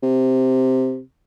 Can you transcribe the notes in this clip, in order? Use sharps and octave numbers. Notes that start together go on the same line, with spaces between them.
C3